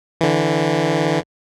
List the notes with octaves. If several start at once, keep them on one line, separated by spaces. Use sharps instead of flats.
D3 E3